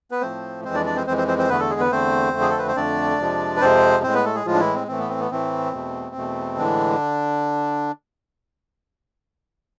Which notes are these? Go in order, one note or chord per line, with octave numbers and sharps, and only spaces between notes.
B3 B4
A2 F3 A3 C4 C5
F2 E3 G#3 C4 C5
D4 D5
D4 D5
C4 C5
F2 E3 G#3 C4 C5
C4 C5
C4 C5
C4 C5
E2 D3 A3 B3 B4
A3 A4
G#3 G#4
B3 B4
E2 D3 A3 C4 C5
F2 D3 A3
G#4
A4
B4
C5
F2 D3 A3 D4 D5
F2 C3 F3 G#3
B4
F2 C3 F3 G#3 C4 C5
A2 G#3 C4 C5
B3 B4
A3 A4
G#3 G#4
A2 F3 G#3 F4
D4
E3 E4
C4
A2 E3 A3 C4
B3
C4
B3
A2 E3 A3 C4
E2 B2 A3
E2 B2 A3
A2 D3 E3 G#3 D4